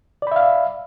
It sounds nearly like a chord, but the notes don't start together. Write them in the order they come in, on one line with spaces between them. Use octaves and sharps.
D5 B5 E5 F5